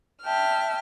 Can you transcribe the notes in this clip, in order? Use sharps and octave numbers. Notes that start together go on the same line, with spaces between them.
E5 G5 A5 F6